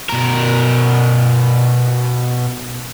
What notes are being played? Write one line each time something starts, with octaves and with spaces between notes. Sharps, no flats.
B2 A#4